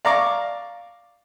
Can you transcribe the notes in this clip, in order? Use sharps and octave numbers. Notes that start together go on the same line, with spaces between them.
D5 F5 A#5 C#6 D6